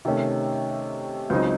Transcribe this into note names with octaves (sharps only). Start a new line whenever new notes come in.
C3 D#3 A3 C#4
C#2 C#3 F#3 C4 D#4